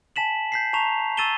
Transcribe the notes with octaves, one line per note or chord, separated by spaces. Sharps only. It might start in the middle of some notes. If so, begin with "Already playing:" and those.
G#5 A5 B6 E7 F#7
G6 B6 C7
A5 A#5 C#6 F7
C#6 E6 A6 D#7 E7 G7